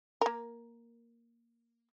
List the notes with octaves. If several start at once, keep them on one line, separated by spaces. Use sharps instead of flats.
A#3 A#4